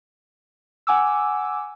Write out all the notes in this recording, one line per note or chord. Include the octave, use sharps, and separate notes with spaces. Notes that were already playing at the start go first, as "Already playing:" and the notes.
F#5 G#5 D6 E6